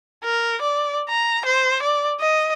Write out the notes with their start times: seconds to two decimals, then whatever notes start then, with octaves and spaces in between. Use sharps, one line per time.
0.24 A#4
0.61 D5
1.09 A#5
1.45 C5
1.82 D5
2.20 D#5